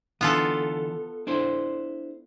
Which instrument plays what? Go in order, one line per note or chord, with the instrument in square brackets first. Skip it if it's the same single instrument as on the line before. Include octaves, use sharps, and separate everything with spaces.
[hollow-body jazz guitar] D3 E3 [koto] B3 F4 A4
[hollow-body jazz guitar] D4 E4 C5